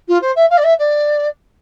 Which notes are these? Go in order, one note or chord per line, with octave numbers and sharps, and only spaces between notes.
F4
C5
E5
F5
D5
E5
D5